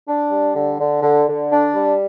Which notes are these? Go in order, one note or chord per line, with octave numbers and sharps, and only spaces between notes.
D4
G3
D3
D3
D3
D3
D4
G3